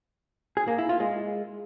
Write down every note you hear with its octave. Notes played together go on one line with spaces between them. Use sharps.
G#4
A#3
E4
F4
G#3